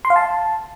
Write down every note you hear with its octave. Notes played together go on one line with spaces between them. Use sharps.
C6
F5
A5